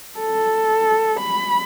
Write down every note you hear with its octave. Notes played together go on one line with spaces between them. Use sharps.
A4
B5